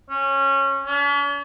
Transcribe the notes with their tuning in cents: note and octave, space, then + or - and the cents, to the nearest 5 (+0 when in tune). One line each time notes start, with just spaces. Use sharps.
C#4 -20
C#4 +45